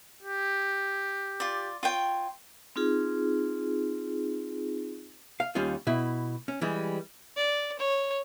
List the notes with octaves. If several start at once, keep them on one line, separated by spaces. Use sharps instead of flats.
G4
F4 D5
F4 C#5 G5
C4 D#4 F4 G#4
F5
D#2 G3 C#4 F4
B2 E4
C#4
E3 G3 G#3
D5
C#5